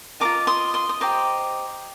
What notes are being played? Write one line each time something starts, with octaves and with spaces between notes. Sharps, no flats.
F4 A#4 D#5 A#5 D6
C6 D#6
C6 D#6
D#6
G4 C5 D#5 A#5 D6